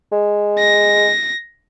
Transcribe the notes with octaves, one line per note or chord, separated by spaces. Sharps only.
G#3
A#6